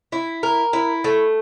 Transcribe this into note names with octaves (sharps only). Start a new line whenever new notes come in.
E4
A#4
E4
A3